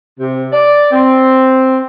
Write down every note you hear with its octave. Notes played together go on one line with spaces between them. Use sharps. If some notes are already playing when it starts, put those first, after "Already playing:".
C3
D5
C4